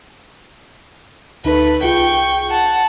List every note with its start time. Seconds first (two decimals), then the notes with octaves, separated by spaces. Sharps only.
1.44 D2 A3 D#4 B4 B5
1.83 C2 F4 G#4 G5 C#6
2.49 F#5 A5